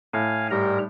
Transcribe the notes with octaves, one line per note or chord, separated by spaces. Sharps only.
A2 F5 G#5
G#2 G3 A#4 A#5